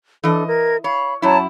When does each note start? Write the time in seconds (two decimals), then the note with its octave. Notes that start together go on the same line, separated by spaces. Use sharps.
0.24 E3 D4 A4 D#5
0.47 A#4 G#6
0.84 C#5 F5 B5
1.22 F#2 E4 C#5 A5 A#5